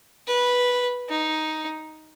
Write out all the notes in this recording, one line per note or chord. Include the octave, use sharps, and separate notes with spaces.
B4
D#4